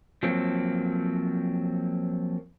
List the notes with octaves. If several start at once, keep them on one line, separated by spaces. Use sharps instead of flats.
F3 F#3 A#3 C4